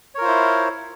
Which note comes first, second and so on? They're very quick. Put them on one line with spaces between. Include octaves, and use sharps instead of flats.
C#5 A#4 F4 C5 E4